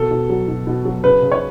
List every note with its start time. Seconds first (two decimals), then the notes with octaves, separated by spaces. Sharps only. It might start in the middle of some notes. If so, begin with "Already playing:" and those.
Already playing: B2 A4
0.11 B2
0.29 F#3
0.48 B2
0.67 B2
0.85 F#3
1.04 C#3 B4
1.23 C#3
1.32 C#5